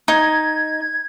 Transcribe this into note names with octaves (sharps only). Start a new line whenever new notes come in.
D#4 G#6